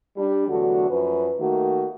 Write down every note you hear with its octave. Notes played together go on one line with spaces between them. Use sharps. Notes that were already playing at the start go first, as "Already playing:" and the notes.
G3 D4
E2 D3 F#3 A3 F#4
F#2 F3 C#4 B4
D#3 A3 A#3 F#4